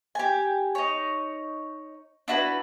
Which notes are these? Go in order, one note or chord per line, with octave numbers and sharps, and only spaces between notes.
G4 G#5
D#4 C#5
D4 E4 F#4 B4